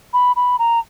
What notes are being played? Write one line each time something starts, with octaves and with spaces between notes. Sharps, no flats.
B5
B5
A#5